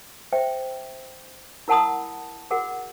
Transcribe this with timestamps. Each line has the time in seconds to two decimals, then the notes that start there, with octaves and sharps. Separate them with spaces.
0.32 C5 E5 G5
1.68 E4 A#4 F#5 A5 B5 D#6
2.50 F#4 G#4 A#4 F#5